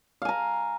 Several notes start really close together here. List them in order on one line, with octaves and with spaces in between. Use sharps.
F5 G#5 A#5